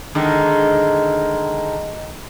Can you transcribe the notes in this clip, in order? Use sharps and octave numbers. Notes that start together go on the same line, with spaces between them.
D3 D#3 G#3